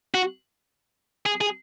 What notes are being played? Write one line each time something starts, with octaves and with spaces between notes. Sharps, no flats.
F#4
G#4
G#4